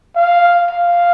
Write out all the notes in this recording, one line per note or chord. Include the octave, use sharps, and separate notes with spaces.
F5
F5